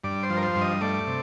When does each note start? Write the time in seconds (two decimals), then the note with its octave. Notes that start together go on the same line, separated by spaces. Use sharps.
0.04 G2 D5
0.23 C5
0.30 F3
0.37 A#4
0.43 C5
0.56 G2
0.61 D#5
0.81 A3 D5
1.07 C3